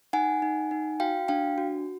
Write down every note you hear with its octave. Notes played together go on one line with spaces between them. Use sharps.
D#4 F#5 G#5
D#4
D#4
F#4 F5 G5
D4 F5 G5
F#4